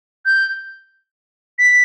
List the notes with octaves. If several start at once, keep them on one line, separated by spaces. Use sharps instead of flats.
G6
B6